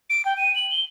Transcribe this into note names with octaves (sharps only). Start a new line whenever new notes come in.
D7
G5
D#7
F#7
G7